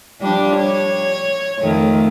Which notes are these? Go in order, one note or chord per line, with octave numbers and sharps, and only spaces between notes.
F3 G3 D4
C#5
F2 D#3 A3